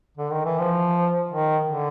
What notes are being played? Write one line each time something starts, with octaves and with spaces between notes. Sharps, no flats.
D3
D#3
E3
F3
D#3
D3